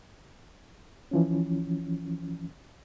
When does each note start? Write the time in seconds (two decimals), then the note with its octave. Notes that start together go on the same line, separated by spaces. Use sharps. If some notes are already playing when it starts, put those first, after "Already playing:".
1.11 E3 F3 C#4